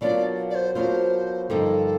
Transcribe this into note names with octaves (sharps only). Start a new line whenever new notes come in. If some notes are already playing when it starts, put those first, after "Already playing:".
B2 F#3 A#3 D4 F4 D5
D5
C5
B2 F#3 A#3 D4 F4 C5
G2 D3 F3 A#3 D#4 A4